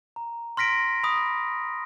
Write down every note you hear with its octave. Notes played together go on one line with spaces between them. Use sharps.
A#5
C6 F6 A#6 B6 D7
B5 D#6